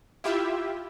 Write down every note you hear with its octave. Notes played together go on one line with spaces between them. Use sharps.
E4 F4 G4 E5